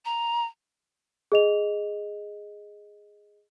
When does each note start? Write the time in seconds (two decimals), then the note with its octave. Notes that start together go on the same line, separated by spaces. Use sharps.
0.05 A#5
1.32 G#4 D#5 F7